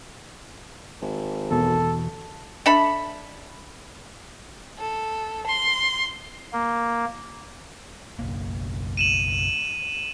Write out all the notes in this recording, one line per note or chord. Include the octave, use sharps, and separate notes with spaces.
G#1
E2 B2 A4
D4 A4 E5 B5
A4
C6
A#3
F#1 B1 A#3
D#7 E7 F#7